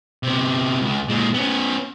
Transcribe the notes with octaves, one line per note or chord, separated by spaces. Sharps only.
C3 B3
C#2
A#2 G#3
B3 C#4